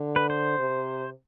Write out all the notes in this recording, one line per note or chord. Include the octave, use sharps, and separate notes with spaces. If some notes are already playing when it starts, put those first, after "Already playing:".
Already playing: D3
B4
C5
C3